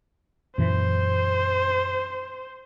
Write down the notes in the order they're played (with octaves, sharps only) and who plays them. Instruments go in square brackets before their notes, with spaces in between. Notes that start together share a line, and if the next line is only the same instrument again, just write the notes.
[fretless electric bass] F#2 A#2 E3 [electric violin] C5